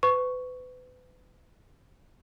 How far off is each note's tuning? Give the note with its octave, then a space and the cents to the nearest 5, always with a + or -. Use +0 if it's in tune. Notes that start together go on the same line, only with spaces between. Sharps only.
B4 +35 C#6 +5